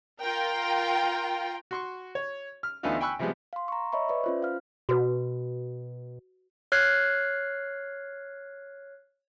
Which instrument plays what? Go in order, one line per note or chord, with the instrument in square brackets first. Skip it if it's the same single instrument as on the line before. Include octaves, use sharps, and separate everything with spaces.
[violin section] F4 A#4 G5
[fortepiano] F#4 C6 C#6
C#5
F6
D2 E3 A3 B3 D#4 F4
G5 G#5 B5 C#6 E6 F#6
C3 F3 G3 G#3 B3
[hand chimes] F5 C6
A#5 C#6
C#5 D#5 E5 B5 C#6
B4 D5 E5
C#4 F4 C5
F5 F6
[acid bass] B2 [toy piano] F#4 B4
[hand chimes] C#5 F6 F#6 G#6 C7